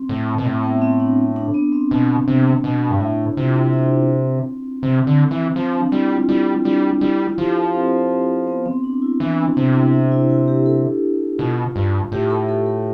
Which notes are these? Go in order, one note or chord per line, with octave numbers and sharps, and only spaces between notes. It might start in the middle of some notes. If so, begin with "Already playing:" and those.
Already playing: C4
A2
B2
A2 C4
B3
C4
D4
D4
B3
C4
B2 C4
C3
B2 D4
G2
A2 E4
C3 F4
E4
D4
C4
C3 C4
D3
E3
F3 C4
D4
G3 E4
F4
G3 E4
G3 D4
G3 E4
F4
F3 G4
A4
C4
B3
C4
D4
E4
E3 D4
C4
C3 D4
E4
D4
E4
E4
G4
A4
B2 F4
G2
A2 G4
A4
A4
A4